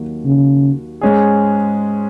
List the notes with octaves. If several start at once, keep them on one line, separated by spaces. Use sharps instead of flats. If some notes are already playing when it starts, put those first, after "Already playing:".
Already playing: D#2 D#3 F#3 A#3 F#4
C#3
G#2 G#3 C#4 G#4